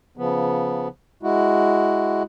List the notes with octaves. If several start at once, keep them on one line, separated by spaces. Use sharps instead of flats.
C#3 F3 B3
G#3 E4 F#4